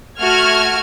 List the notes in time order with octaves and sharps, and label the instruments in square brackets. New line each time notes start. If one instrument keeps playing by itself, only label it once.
[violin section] A3 F#4 F6 G#6